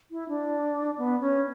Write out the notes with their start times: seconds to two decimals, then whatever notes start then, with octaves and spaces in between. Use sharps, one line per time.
0.11 E4
0.29 D4
0.98 B3
1.21 C#4